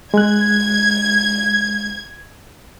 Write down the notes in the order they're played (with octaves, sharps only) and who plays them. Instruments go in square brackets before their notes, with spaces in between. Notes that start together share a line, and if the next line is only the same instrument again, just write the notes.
[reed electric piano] G#3 F#6 [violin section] G#6